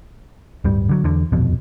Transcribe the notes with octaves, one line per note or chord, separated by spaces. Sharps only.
D1 G2 G3
D3 F#3
E2 D3
D#1 A#1 F2 B2